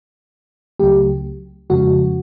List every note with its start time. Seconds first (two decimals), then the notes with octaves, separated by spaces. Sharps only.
0.79 C#2 C#3 F#3 A3 G4
1.70 F2 C#3 F3 G#3 F#4